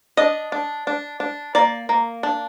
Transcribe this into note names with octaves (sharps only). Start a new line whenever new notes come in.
D4 D#5
D4
D4
D4
A#3 D5
A#3
D4